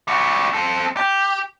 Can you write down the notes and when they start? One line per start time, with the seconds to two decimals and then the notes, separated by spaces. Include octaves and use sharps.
0.08 G3 F#4
0.54 C4 A4
0.97 G4